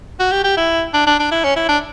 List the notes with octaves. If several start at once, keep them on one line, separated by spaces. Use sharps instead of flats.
F#4
G4
G4
E4
D4
D4
D4
E4
C#4
E4
D4